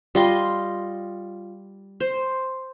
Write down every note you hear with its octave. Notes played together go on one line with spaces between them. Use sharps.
G3 F4 D#5 C6
C5